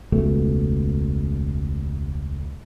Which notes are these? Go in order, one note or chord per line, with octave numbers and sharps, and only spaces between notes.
E1 C#2 B2 A3